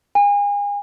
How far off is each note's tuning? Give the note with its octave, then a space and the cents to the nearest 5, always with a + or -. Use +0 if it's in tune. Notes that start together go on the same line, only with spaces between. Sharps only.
G#5 -35